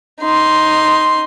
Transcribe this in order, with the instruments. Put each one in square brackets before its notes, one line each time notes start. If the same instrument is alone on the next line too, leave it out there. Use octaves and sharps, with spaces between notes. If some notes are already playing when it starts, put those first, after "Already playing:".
[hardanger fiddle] D#4 C6